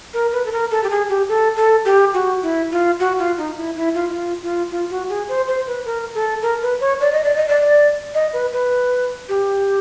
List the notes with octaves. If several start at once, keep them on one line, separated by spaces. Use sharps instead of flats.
A#4
B4
A4
A#4
A4
G4
G#4
G4
A4
A4
G4
F#4
E4
F4
F#4
F4
D#4
E4
E4
F4
E4
F4
F4
F4
F#4
G#4
C5
C5
B4
A#4
A4
A#4
B4
C#5
D5
D#5
D5
D#5
D5
D#5
B4
B4
G4